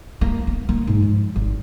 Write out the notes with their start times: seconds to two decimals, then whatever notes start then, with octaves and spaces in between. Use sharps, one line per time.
0.21 A#3
0.47 B3
0.69 A#3
0.87 G#2
1.02 F3
1.36 G#1